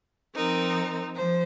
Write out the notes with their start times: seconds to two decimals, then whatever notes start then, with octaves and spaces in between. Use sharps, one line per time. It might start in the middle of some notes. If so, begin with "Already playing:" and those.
0.34 F3 C4 D#4 A#4
1.15 F3 C5